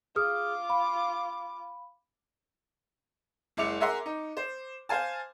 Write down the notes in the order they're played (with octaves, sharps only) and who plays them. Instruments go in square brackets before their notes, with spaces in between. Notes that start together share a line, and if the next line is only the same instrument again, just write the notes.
[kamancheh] F4 D6 [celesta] G#4 D#6 F6
[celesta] F5 B5
[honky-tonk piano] F#1 G#3 E4 D6 C#7 F7
G#4 A#4 E5 F#5 A#5 C6
D#4
C5
C5 F5 G#5 A5